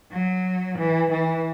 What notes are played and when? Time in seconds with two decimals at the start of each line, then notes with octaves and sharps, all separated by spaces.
0.12 F#3
0.78 E3
1.11 E3